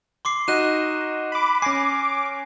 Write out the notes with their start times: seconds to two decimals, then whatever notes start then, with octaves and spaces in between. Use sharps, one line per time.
0.25 C6 D6 C7
0.48 D#4 F#4 D#5 F#6 D#7 E7
1.32 B5 D6
1.62 C#4 G#5 D6 A#6 C7